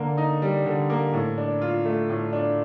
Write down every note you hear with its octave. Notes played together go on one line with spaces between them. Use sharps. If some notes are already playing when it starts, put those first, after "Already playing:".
Already playing: D3 A#3
D#4
G3
D3
A#3
A2
D4
F4
A3
A2
D4